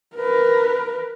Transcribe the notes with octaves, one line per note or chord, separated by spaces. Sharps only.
A#4 B4